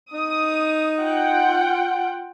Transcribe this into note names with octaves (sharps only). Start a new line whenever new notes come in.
D#4 D#6
F4 F#5 G5